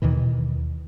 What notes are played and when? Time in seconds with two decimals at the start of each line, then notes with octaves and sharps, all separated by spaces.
0.02 D#2 B2 D#3 E3